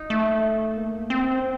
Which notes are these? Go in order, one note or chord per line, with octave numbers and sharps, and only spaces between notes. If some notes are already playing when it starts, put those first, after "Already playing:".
Already playing: D#4
A3
A#3
C4